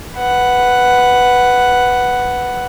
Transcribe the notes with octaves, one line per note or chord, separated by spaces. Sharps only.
B4 F#5